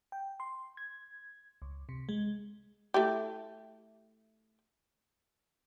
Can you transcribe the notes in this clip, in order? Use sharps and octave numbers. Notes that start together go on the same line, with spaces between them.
G5
C6
G#6
C#2
C3
G#3
A3 E4 G4